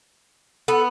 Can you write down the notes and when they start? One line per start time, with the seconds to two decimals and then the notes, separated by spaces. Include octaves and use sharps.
0.68 B3 A4